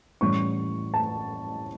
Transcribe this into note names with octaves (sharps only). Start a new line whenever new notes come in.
A2 E3 G3 C#4 C#6
A5